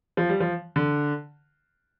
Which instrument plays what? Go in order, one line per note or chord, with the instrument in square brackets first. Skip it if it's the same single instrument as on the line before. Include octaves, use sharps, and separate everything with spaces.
[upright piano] F3
G3
F3
D3